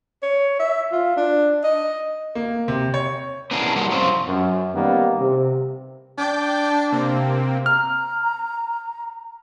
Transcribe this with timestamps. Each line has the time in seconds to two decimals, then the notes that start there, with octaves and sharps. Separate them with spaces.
0.23 C#5
0.60 E5
0.92 F4
1.17 D4
1.64 D#5
2.35 A#3
2.68 C3
2.94 C#5
3.51 B3 C#4 D4 E4 G#4 A#4
3.76 G3 A#3 E4 F#5
3.90 F#2 F3 C4 C#4 F4
4.28 F#2
4.75 D#3 G3 A#3 B3 C#4
5.19 C3
6.18 D4 G5 D6 G6
6.92 C3 A#3 C4
7.66 A#5 F6